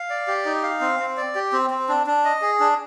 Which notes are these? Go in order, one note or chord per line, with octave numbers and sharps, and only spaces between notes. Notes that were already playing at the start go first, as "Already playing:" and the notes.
Already playing: F5
D5
G4
D#4
F5
C4
C4
D5
G4
C4
C4
D4
D4
D#5
G#4
D4